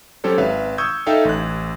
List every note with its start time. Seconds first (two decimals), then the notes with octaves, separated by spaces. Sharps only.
0.24 F#3 C#4 G4 A4 C5 C#5
0.38 G#1 B4 E5 F5
0.78 C#6 D#6 E6 G6 G#6
1.06 D#4 A4 E5 F5 G5
1.25 A1 F#6